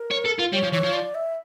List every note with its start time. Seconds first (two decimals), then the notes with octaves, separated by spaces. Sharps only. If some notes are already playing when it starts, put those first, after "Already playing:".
Already playing: A#4
0.11 C#5
0.25 A4
0.39 F4
0.52 G3 C#5
0.63 F3
0.72 E3 C#5
0.83 F3
0.93 D5
1.15 E5